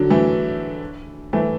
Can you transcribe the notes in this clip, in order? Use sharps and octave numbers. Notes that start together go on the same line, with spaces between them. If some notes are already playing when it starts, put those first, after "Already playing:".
Already playing: D3 F#3
E3 A3
E3 A3